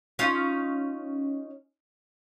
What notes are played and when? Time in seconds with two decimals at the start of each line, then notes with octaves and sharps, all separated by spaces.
0.19 C#4 D#4 F4